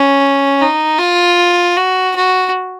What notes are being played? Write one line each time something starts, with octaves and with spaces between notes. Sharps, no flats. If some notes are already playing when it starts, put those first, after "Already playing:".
Already playing: C#4
D#4
F4
F#4
F#4